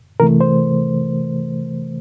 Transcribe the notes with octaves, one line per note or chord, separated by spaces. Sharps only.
C3 E3 A3 A#4
C5